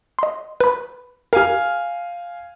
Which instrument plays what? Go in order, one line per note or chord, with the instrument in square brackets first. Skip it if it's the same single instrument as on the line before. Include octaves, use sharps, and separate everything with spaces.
[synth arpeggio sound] D#5 C6
B4 B5
[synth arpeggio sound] G4 A#4 [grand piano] F5 G#5 F6